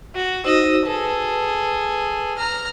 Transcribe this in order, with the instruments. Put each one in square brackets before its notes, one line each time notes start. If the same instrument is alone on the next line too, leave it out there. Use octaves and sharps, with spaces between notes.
[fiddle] F#4
[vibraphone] D#4 F#4 C5 [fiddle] D#5 E6
[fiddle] G#4 A4 [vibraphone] B4
[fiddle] A#5 F6